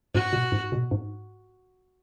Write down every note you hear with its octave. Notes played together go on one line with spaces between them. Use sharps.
G#2 F#4
B2
G#2
B2
G#2